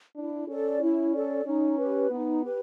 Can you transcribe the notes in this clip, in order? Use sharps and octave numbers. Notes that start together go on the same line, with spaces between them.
D4 E4
C#4 A4 D5
E4
A4 D5
C#4 D#4
G4 B4
B3 D#4
G4 B4